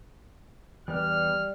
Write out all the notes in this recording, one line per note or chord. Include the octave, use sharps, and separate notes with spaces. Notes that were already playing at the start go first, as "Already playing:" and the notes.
E2 G3 B4 D5 F6